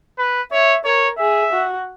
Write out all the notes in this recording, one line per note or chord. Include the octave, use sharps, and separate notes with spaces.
B4
C#5 E5
A#4 C#5
G#4 E5
F#4